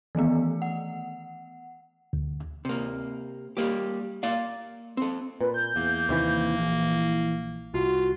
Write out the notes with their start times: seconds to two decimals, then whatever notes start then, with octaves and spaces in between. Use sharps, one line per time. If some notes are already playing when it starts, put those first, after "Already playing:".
0.15 D#3 E3 A3 B3
0.62 F#5
2.13 D2
2.65 C3 A#3
3.57 G3 A#3 G4
4.23 A#3 D5 F5
4.97 C4 A4
5.41 A#2 B4
5.54 G6
5.76 E2 A#3
6.09 D#2 C3 E3
6.58 A#1 E3
7.74 C2 F4 F#4